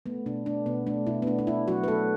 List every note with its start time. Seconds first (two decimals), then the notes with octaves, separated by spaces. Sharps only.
0.06 A3 B3
0.26 B2 D4
0.46 A3 D4
0.66 B2 B3
0.87 A3 D4
1.07 B2 E4
1.22 B3
1.27 A3 D4
1.39 D4
1.47 B2 E4
1.68 F#3 F#4
1.84 B4
1.88 A3 A4